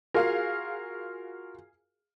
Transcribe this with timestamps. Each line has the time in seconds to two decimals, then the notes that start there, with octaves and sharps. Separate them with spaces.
0.14 F4 F#4 G#4 A#4 F5 C6